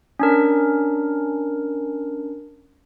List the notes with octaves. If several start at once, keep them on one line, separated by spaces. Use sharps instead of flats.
C#4 D4 A#4